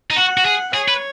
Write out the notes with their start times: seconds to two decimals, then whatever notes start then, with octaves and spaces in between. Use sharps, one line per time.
0.10 D#4
0.16 F#4 F#5
0.37 F#4
0.45 G#4
0.74 G#4 C#5
0.88 B4